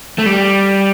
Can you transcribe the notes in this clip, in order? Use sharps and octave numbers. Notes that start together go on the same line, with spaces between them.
A3
G3